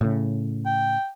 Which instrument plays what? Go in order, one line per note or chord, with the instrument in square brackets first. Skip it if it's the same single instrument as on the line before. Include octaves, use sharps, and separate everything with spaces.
[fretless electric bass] A2 C#3
[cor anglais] G5